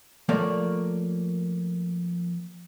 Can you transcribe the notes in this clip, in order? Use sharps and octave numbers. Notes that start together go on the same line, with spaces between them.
F3 A3 A#3 C#5 D5